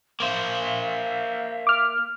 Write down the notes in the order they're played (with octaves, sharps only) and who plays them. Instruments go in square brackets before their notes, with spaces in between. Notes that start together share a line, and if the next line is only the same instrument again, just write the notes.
[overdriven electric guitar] A#3 C5 [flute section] E5 F5
[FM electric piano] D6 F6